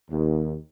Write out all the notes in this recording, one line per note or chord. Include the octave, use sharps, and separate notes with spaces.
D#2